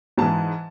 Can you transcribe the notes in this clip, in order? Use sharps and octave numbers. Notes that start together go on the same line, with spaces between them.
G#2 E3 A5